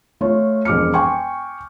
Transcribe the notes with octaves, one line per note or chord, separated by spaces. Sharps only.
A3 F4 C#5
E1 F2 D6 F6 C#7
G5 G#5 C6 C#6